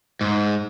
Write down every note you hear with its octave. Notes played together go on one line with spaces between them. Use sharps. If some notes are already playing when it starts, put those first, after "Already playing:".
G#2